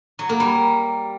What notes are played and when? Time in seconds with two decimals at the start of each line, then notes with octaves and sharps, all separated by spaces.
0.19 F#3
0.29 A#3
0.40 G3